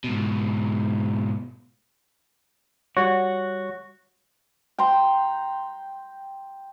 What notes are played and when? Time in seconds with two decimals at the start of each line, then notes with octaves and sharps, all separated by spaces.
0.04 G#2 B2
2.97 G3 F#4 C#5
4.78 G5 A#5 C6